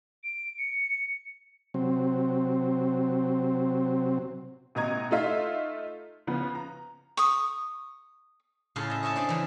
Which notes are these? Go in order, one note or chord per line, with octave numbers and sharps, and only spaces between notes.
D7
C#7
C3 F#3 C4
A1 B2 D#5 A#5 G#6
A3 D#4 F4 E5 F5
C#3 F3 B3
A#5
C#6 D#6
A2 C#3 F4 A4 F5 G#5
D#5 E5
C#5 D#5 E5 G#5 A5
D4 C5 D5 E5
C#3 E3